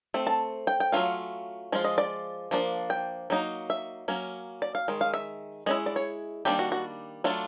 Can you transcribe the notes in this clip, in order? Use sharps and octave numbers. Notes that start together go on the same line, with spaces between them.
A3 C4
A5
G5
G5
F#3 A3 C#4 F4 F5
F3 G#3 F4
D#5
D5
F3 A#3 D4
G5
F#3 A#3 D#4
E5
F#3 A#3 C#4
D5
F5
D#3 G#3
F5
E5
G#3 C#4 E4 D#5
D5
C#5
D#3 G3 A#3 D4 G4
F#4
F#4
F#3 A3 D4 F4